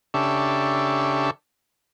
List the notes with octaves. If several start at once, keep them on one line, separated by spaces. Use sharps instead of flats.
C#3 D4 G4 A4 E5 C#6